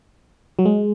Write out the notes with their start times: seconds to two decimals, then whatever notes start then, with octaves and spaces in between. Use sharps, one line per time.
0.59 F#3
0.65 G#3